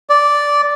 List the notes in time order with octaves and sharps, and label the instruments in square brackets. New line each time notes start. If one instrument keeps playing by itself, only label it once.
[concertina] D5